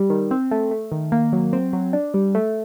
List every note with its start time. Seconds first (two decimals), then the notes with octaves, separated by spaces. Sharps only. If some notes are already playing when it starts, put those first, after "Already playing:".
Already playing: G3
0.10 D#3
0.31 C4
0.51 A3
0.71 A3
0.92 D#3
1.12 A#3
1.33 F#3
1.53 C4
1.73 F#3
1.93 D4
2.14 G3
2.35 A3